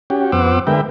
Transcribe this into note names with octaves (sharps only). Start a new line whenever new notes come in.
C#4 F#4 G4
F2 B3 C5 F#5 D6 E6
D3 G#3 A#4 B4 E5 G5